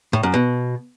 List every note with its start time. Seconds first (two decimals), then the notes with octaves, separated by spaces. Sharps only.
0.13 A2
0.23 F#2
0.34 B2